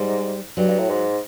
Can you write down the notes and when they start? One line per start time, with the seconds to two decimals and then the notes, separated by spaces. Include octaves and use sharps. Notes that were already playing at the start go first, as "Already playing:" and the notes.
Already playing: G#2 G3
0.57 G2 F#3
0.68 G2
0.79 A2
0.90 G#2